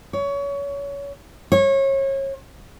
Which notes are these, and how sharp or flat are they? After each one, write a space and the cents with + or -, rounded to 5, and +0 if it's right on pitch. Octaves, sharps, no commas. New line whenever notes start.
C#5 +25
C#5 -30